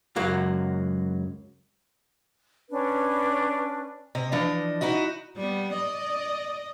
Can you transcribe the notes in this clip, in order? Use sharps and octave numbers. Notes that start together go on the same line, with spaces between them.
C#2 F#2 F#3 A#3
C#4 D4 B4
C3 D#5
E3 F3 D4 D#5
D#4 E4 F#4 D#5
G3 B3
D5 D#5